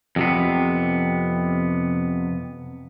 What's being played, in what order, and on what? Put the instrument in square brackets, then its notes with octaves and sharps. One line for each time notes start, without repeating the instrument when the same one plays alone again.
[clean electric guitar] F2 C3 B3